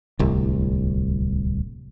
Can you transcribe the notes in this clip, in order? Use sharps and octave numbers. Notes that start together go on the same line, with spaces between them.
D1 C2